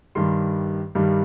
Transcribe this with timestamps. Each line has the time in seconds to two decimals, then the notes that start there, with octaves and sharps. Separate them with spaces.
0.15 G2 D#3 G3 C6
0.95 G2 D#3 G3